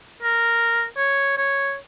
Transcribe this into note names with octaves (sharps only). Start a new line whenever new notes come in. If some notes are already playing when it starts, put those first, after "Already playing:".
A#4
C#5
C#5